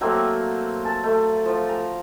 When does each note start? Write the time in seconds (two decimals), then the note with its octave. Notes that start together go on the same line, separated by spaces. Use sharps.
0.01 F#3 A3 A#3 C4
0.85 A5
1.03 A3
1.46 F3
1.69 A#5